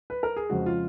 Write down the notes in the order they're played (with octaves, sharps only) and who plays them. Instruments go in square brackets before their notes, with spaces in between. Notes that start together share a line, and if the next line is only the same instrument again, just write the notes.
[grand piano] B4
A#4
G#4
F2 C#3 G#3 F#4
F4